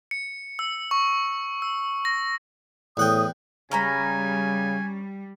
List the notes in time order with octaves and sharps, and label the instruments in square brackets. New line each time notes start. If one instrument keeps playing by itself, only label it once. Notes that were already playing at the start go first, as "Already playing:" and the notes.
[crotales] C#7
E6
C#6
E6
A#6
[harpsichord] E2 F#5 G5 [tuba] A2 [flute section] D#6
[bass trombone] C#3 [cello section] G3 [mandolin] C#4 A#5 B5 [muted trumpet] G#5